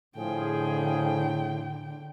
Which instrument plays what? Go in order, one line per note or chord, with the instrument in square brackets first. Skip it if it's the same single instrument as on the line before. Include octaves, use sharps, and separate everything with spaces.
[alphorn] A2 [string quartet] D3 [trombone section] F3 G#4 [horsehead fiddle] G5